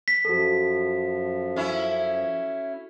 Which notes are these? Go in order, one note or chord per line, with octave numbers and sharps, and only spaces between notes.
B6
F#2 F3 F#4 A4
C#4 E4